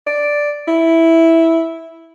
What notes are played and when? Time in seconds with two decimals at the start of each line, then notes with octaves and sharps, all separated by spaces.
0.07 D5
0.68 E4